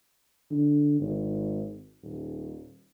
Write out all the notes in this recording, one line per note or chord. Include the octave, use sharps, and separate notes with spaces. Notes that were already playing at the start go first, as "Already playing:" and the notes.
D3
G#1
D#1